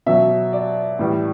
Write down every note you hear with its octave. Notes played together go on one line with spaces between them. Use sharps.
B2 F#3 E5
D5
A2 E3 G3